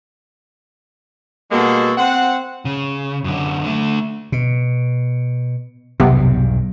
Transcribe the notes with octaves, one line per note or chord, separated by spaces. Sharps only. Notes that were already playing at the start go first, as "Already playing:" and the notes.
B2 G3 G#3 A#3 F#4 A4
C4 F#5
C#3
F#2 D3
D3 A3
B2
B1 E2 G2 C3 B3